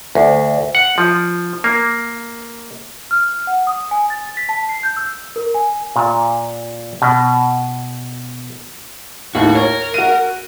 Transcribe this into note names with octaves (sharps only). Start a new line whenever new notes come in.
D2
F#5
F3
A#3
F6
F#5
D#6
G#5
A6
B6
A5
C7
G6
E6
A#4
G#5
A#2
B2
D#2 A2 F#4
A#4 C#5
F#4 D#7